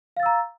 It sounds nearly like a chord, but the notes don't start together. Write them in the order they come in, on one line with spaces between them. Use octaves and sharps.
F5 A6 E6 A#5